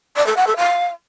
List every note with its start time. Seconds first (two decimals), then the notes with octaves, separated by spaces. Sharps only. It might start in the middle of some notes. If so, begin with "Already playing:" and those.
0.16 D5
0.27 A4
0.37 F#5
0.47 A4
0.57 F5